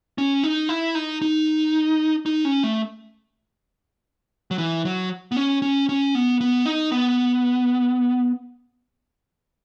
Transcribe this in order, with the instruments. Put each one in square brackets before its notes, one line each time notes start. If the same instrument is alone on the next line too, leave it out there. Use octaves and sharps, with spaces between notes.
[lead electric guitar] C#4
D#4
E4
D#4
D#4
D#4
C#4
A3
F#3
E3
F#3
B3
C#4
C#4
C#4
B3
B3
D#4
B3